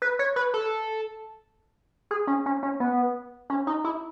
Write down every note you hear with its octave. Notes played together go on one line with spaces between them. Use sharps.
B4
C#5
B4
A4
G#4
C#4
C#4
C#4
B3
C#4
D#4
E4